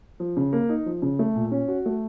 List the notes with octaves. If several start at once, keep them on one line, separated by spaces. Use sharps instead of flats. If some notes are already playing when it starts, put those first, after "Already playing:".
F3
C#3
A#3
D#4
F3
C#3
A3
A#2
C#4
F#4
A3